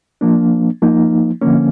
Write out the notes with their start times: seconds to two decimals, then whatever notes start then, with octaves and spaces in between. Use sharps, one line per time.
0.21 F3 A#3 D4
0.82 F3 A#3 D#4
1.41 D3 F3 A#3 C#4